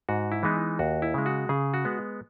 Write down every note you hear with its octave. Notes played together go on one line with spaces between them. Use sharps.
G#2 F#4
E4
E3 G#3 B3 D#4
D#2 F#4
E4
C#3 G#3
F#4
C#3 G#4
F#4
G#3 B3